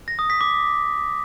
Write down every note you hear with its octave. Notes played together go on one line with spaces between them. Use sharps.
A#6
D#6
B6
D6